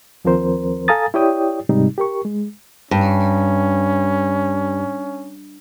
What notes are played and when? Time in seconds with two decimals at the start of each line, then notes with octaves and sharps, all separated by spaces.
0.25 D#2 F3 C4 A#4 C5
0.88 A4 F5 G#5 A#5 D#6 A6
1.14 E4 G4 C#5 D5 G5 D#6
1.69 G#2 C3 G3 D#4
1.98 G4 A#4 C#6
2.25 G#3
2.91 G2 C#4